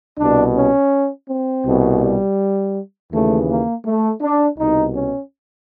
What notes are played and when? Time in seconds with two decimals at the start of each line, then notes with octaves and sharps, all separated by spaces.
0.18 C2 B2 D4
0.55 C#4
1.28 C4
1.65 C2 B2
2.01 G3
3.12 D#2 C#3 E3 A3
3.49 A#3
3.85 A3
4.21 D4
4.58 C2 B2 D#4
4.95 C#4